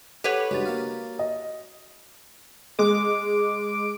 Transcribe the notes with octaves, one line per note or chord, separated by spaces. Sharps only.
G4 A4 B4 C#5 F#5 F#7
C#2 G2 G#3 F#4 A6
A#3 F5
D#5
G#3 D6